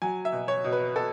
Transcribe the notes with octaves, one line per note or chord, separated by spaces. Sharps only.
F#3 G#5
E5
B2
C#5
B2
B4
B2 A4